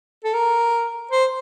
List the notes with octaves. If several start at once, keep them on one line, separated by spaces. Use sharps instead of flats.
A4
A#4
C5